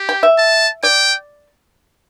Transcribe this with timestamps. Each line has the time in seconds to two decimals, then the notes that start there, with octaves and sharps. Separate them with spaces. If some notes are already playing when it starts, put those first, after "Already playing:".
Already playing: G4
0.09 G5
0.23 E5
0.38 A5
0.83 D5 G5